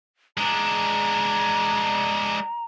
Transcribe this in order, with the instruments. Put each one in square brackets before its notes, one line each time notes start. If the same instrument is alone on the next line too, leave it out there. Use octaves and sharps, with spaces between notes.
[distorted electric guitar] G#3 D4 [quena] A#5